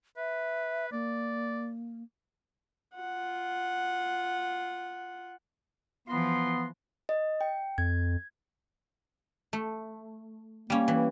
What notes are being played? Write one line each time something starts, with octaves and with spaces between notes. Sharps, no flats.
B4 E5
A#3 D5
F4 F#5
E3 F3 B3 F4 A#5 C6
D#5
G5
F2 G#6
A3
G3 A#3 C#4
E3